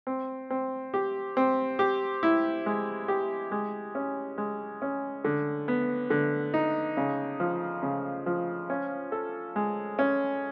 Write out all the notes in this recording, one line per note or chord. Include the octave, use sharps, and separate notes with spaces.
C4
C4
G4
C4
G4
E4
G#3
G4
G#3
C#4
G#3
C#4
D3
B3
D3
D#4
C#3
F3
C#3
F3
C#4
A4
G#3
C#4